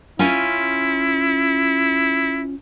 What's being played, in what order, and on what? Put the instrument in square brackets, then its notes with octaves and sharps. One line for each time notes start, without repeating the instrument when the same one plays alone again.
[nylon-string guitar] C#4 F4 G#5 [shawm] E4